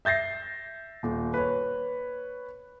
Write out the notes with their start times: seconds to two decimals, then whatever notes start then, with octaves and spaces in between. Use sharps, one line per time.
0.05 E5 G6 A6 A#6 C7
1.03 D#1
1.34 B4 C#5